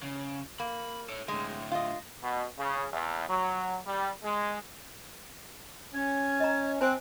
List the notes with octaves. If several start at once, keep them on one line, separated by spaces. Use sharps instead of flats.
C#3
A#3 B5
A4 C#5
A2 D3 G#3
F4 D#5
B2
C#3
E2
F#3
G3
G#3
C#4 G#6
D#5 A#5
C4 C5 G#5 A5 F#6